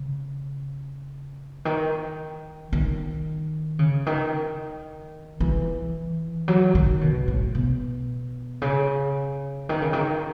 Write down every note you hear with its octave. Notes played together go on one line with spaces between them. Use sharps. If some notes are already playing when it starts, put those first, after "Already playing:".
Already playing: C#3
D#3
D#3
C#3
D#3
E3
F#3
D#3
B2
A2
B2
C#3
D#3
C#3
D#3